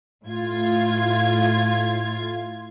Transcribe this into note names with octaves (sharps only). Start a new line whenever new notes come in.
A2 F4 G#6